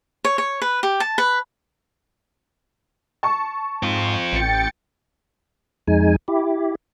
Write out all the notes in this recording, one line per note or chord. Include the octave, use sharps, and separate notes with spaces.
C#5
C#5
B4
G4
A5
B4
A5 C#6
G#2 C4 F4
A1 G5 A6 C#7
F2 G#3 D#4 G#5
E4 G4